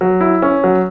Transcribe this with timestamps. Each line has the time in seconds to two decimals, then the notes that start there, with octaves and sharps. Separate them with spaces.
0.01 F#3
0.21 E4
0.42 C#4
0.64 F#3